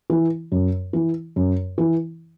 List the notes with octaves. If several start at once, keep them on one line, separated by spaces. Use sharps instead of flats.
E3
F#2
E3
F#2
E3